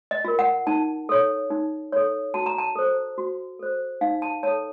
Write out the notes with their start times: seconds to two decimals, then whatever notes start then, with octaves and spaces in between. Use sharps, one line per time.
0.11 D#5
0.25 F4 A#4
0.39 F#5
0.67 D#4 A5
1.09 A4 C#5
1.50 D#4
1.92 A4 C#5
2.34 F#4 A5
2.46 A#5
2.58 A5
2.76 A4 C5
3.18 F#4
3.59 A4 C5
4.01 D#4 F5
4.22 A5
4.43 A4 C#5 A5